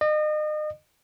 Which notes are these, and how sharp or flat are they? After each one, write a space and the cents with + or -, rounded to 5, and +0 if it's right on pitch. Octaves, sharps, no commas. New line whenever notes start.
D#5 -35